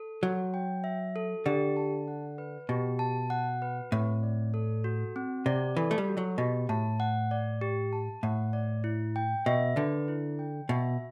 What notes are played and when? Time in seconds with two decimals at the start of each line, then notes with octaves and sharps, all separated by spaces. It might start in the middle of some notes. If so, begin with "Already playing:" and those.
Already playing: A4
0.22 F#3 F#4
0.54 G5
0.84 E5
1.16 A4
1.46 D3 G4
1.77 A5
2.08 F#5
2.38 B4
2.69 B2 G4
2.99 A5
3.30 F#5
3.62 B4
3.91 A2 C4
4.23 D5
4.54 A4
4.84 F#4
5.16 C4
5.46 C3 D5
5.77 E3 A4
5.91 A3
5.98 G3
6.08 F#4
6.17 F#3
6.38 B2 G4
6.69 A2 A5
7.00 F#5
7.31 D5
7.61 G4
7.93 A5
8.23 A2 F#5
8.53 D5
8.84 E4
9.16 G5
9.46 B2 E5
9.76 D3 B4
10.08 E4
10.39 G5
10.69 B2 E5